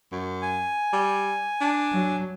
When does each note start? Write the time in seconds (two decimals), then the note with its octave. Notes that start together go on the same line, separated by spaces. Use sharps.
0.12 F#2
0.42 G#5
0.93 G3
1.61 D4
1.93 F#3